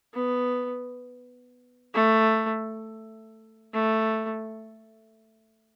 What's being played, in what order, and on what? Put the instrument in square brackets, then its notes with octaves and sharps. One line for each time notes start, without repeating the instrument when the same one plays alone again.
[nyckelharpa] B3
A3
A3